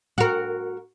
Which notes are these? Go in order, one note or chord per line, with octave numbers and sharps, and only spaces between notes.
F#4 A#4